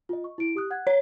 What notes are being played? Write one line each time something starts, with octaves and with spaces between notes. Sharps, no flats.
F4 D#5
C#6
E4 D7
G4 D#6 F#6
F#5 F#6 G#6
C#5